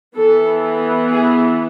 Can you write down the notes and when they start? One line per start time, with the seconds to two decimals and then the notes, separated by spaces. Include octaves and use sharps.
0.17 E3 B3 A4
1.12 G#4